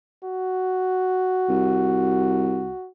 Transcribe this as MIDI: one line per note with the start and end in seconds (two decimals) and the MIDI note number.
0.24 2.87 66
1.49 2.72 36